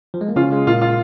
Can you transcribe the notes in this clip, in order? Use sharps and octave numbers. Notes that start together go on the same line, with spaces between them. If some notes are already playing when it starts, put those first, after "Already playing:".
F3
G#3
A#3
C#3 C#4 F4
G#3
A#2 A#3 F4
F4